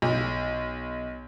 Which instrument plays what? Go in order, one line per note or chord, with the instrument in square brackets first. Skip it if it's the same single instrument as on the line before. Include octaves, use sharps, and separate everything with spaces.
[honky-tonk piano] B1